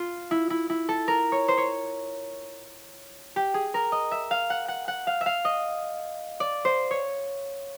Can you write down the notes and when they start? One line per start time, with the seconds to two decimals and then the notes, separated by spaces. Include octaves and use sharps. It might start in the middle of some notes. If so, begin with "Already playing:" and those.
Already playing: F4
0.31 E4
0.50 E4
0.70 E4
0.89 A4
1.08 A#4
1.32 C#5
1.48 C5
1.58 C#5
3.36 G4
3.54 G#4
3.74 A#4
3.92 D#5
4.11 E5
4.31 F5
4.50 F#5
4.68 F#5
4.88 F#5
5.07 F5
5.21 E5
5.26 F5
5.45 D#5
6.40 D5
6.65 C5
6.91 C#5